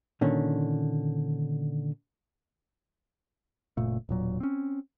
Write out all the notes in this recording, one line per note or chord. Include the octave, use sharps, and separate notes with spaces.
A#2 D3 D#3 C#4
F#1 A#2 A3
E1 A#2 F#3
C4 C#4